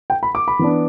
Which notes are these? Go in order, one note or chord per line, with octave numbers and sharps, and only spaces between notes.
G5
B5
D6
B5
E3 B3 D4